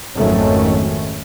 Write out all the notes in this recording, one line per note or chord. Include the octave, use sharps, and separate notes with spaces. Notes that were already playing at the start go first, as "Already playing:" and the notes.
G#1 F2 D#3 F#3 A3 C#4